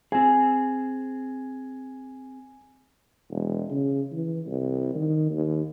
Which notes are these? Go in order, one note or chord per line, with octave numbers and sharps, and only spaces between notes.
C4 G#4 G#5
E1
C#3
E3
C2
D#3
D#2